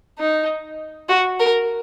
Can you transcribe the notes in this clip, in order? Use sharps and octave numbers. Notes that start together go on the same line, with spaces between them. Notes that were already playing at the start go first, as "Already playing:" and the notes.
D#4
F#4
A#4